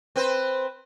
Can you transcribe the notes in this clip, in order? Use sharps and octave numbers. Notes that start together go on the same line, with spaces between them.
C4 B4 C5